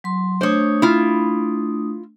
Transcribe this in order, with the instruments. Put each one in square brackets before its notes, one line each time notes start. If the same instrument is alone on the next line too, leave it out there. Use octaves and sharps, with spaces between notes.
[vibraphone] F#3 C6
[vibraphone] A3 D4 D#6 [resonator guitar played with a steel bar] C5 C#5
[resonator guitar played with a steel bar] E4 F4